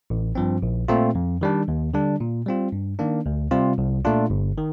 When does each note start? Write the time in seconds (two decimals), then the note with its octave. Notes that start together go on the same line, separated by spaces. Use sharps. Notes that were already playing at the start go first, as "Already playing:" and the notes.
0.10 A1
0.35 G2 F3 C4
0.62 A#1
0.88 A#2 A3 C4 F4
1.15 F2
1.41 D#3 G3 D4
1.68 D#2
1.94 D3 G3 D4
2.20 A#2
2.46 G3 C4 F4
2.72 G2
2.99 D#3 A#3 D4
3.26 D2
3.51 C3 G3 C4 F4
3.78 C2
4.05 A#2 A3 D4 F4
4.30 G1
4.58 D#3